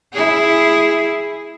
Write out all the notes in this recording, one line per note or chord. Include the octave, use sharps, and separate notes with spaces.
E4 G#4